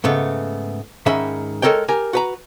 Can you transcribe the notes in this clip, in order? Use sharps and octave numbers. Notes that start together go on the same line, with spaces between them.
G#2 C#3 A3 B3
G#2 D#3 C#4 E5 B5
G#3 A4 A#4 C#5 G5
G4 A#4 G#5
F#4 B4 A#5